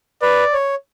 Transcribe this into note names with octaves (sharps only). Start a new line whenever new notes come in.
B4 D5
C#5